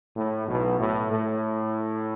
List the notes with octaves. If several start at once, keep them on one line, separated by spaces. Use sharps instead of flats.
A2
B1 B2
A2
A2